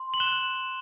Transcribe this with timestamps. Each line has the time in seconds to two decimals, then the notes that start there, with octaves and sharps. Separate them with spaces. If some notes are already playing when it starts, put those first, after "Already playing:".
Already playing: C6
0.14 F#7
0.20 F#6 E7 G7